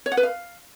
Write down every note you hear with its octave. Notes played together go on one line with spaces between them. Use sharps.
C#5
F#5
B4
F5